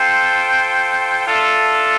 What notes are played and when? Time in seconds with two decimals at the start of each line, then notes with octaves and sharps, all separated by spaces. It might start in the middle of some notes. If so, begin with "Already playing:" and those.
Already playing: F4 A4 C5 G5
1.25 D4 F4 A4 E5